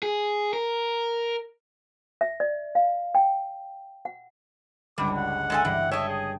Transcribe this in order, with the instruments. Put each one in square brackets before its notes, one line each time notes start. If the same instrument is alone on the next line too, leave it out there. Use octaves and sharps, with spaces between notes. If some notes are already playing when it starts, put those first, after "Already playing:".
[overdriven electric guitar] G#4
A#4
[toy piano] E5
D5
F5
G5
F#5
[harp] G1 C#2 D4 [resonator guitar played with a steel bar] G3 [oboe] D6
[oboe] F#5
[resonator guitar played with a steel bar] G#3 A4 G#5
[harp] G2 G5 [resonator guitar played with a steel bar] E3
[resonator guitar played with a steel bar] C#5 D#5 [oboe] E5 [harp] G5 A5 E7
[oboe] G#4